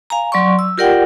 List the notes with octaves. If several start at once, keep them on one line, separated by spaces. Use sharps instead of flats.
F5 G#5 A#5
F#3 D5 C6 C#6
E6
F4 G4 A#4 D5 F#5 G5